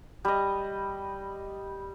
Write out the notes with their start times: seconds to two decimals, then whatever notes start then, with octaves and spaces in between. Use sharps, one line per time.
0.25 G3 D#5